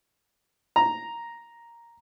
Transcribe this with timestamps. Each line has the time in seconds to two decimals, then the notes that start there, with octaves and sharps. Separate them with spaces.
0.76 A#5